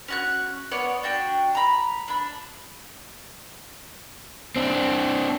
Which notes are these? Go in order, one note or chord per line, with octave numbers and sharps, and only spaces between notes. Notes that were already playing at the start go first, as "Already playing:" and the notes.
C#4 F#4 F#6
B3 C#5 D5 F#5
D4 F#4 G5
A#5 B5
D4 B5
C4 D4